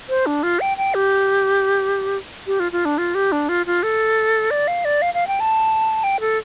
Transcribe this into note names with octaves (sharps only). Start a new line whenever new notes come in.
C5
D4
F4
G5
G5
G4
G4
F4
F4
D4
F4
G4
D4
F4
F4
A4
D5
F5
D5
F5
F5
G5
A5
G5
A4